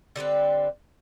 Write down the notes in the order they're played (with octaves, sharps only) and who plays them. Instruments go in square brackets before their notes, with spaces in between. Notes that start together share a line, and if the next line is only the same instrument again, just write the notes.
[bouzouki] D3 G3 C4 B4